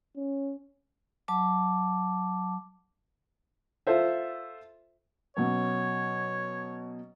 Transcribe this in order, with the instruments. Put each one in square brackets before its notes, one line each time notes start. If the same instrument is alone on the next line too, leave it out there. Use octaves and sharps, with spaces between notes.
[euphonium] C#4
[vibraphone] F#3 A5 D6
[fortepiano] F4 A4 C5 E5
[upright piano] B2 F#3 C#4 [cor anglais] C#5